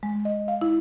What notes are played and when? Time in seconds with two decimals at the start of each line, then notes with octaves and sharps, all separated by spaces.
0.03 G#3
0.25 D#5
0.48 F5
0.61 E4